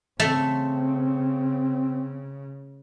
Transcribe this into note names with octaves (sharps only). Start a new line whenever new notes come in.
C#3 A3 C4 E5